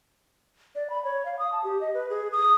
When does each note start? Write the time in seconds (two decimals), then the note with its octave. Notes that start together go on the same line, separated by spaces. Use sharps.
0.75 D5
0.90 B5
1.05 C#5
1.25 F5
1.39 D#6
1.52 A5
1.64 G4
1.81 D#5
1.94 B4
2.10 G#4
2.32 D#6